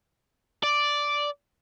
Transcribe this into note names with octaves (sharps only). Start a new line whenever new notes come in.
D5